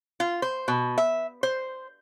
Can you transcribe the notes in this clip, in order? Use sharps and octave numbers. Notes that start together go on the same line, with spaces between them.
F4
C5
B2
E5
C5